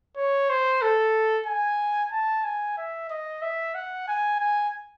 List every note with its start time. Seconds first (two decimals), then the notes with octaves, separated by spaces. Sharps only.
0.17 C#5
0.50 C5
0.82 A4
1.47 G#5
2.12 A5
2.44 G#5
2.78 E5
3.10 D#5
3.42 E5
3.75 F#5
4.08 G#5
4.40 G#5